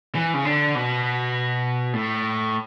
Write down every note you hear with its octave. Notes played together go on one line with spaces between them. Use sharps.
E3
C#3
D3
B2
A2